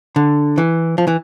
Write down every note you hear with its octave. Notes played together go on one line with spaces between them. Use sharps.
D3
E3
F3
E3